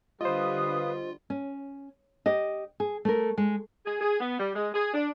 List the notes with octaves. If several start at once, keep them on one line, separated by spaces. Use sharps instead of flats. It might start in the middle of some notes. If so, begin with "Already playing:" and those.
D3 G3 F4 B4 C5 D#5 F5 D#6
C#4
G4 D#5
G#4
A3 A#4
G#3
G#4
G#4
B3
G3
G#3
G#4
D4